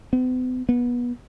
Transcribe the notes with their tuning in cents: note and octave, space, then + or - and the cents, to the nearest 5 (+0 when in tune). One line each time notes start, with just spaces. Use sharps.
B3 +45
B3 -25